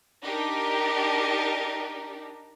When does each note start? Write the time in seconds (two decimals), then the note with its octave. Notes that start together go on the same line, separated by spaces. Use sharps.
0.21 D4 D#4 G4 A#4